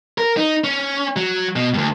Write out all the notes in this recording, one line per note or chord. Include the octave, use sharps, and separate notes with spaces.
A#4
D#4
C#4
F#3
B2
D2 G2